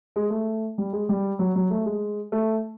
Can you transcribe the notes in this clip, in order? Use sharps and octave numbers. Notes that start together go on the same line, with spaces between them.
G#3
A3
G3
G#3
G3
F#3
F#3
A3
G#3
A3